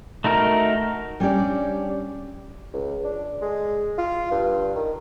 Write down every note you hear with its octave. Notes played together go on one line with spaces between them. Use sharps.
A3 D#4 F#4 A#4 F6
G3 C#4 D4 G4 D5
C#2
D4
G#3
F4
G2
D#3